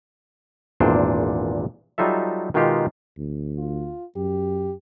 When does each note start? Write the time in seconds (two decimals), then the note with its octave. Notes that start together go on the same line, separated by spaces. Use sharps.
0.80 G#1 E2 A#2 D4 C5
1.98 F#3 G3 D#4 F4 A4 E5
2.54 B2 D#3 G#3 D#4 F4 G4
3.17 D2
3.58 F4
4.16 F#2 G4